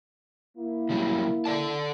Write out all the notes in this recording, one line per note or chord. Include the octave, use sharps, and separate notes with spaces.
A#3 E4
C#3 F#3 G3
A4 D5 A5